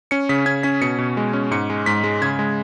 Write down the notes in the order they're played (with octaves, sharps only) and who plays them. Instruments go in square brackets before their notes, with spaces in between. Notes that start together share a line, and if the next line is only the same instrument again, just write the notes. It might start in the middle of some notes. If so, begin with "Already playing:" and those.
[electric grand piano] C#4 C#7
C#3 B6
C#4 G#6
C#4 B6
B2 C#7
B2
G#3
C#4
G#2 C#7
G#3
G#2 B6
G#3
C#3 G#6
G#3